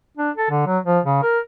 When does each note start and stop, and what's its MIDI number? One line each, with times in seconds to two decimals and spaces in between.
0.17 0.30 62
0.36 0.50 69
0.50 0.62 50
0.66 0.78 54
0.85 0.99 53
1.04 1.19 49
1.22 1.39 70